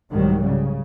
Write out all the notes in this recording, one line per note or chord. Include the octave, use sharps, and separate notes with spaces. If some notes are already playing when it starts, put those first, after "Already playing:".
C2 G#2 D#3 F#3 G3
C#3